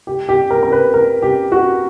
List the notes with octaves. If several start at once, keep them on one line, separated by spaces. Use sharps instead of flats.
G4
G4
A#4
A#4
B4
A#4
G4
F#4